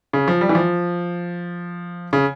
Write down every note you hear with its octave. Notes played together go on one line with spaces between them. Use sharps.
C#3
F3
G3
E3
F3
C#3